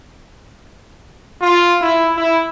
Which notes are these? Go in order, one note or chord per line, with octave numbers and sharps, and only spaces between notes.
F4
E4
E4